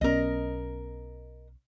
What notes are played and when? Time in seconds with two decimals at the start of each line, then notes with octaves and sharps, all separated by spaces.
0.01 B1 B3 C#4 A#4 D#5